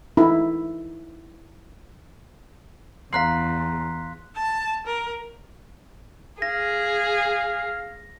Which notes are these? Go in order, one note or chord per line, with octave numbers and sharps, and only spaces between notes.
D#4 E4
E2 F5 A#5 C6 F#6 B6 C7
A5
A#4
G#4 F5 A#6